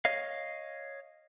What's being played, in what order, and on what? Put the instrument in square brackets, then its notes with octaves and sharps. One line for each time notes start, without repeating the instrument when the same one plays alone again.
[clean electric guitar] C#5 D#5 F5